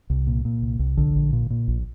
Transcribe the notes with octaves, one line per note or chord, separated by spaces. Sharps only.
C2
A#2
A#2
C2
C2
A#1 D3
A#1
A#2
A#2
A#1